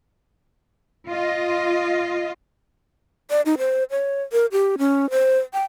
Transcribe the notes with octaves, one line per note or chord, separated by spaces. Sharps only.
F4 D#5
D5
D#4
C5
C#5
A#4
G4
C#4
C5
G5